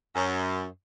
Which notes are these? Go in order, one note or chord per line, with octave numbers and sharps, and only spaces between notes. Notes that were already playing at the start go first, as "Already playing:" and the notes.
F#2